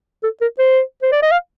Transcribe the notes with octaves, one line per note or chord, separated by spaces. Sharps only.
A4
A#4
C5
C5
D5
D#5
F5